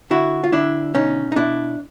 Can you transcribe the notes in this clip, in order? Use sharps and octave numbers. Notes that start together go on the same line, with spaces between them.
D3 E4 F#4
F4
D3 D4 E4
B2 C#4 D#4
D#4
B2 D4 E4